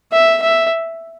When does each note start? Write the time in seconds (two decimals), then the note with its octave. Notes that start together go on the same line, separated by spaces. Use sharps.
0.12 E5
0.42 E5